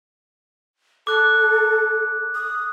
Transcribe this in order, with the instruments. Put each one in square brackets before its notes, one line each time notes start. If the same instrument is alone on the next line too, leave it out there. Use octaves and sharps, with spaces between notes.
[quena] A4 [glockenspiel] D6 F#6
[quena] D#6